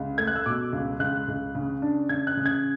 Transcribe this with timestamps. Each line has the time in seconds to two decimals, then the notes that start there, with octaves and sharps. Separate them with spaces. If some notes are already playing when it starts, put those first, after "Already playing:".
Already playing: C#2
0.18 A3 G#6
0.27 F#6
0.36 E6
0.46 B2 D6
0.73 C#2
0.99 C#2 F#6
1.28 C#2
1.55 C#3
1.82 D4
2.09 C#3 G#6
2.27 F#6
2.37 C#3
2.46 G#6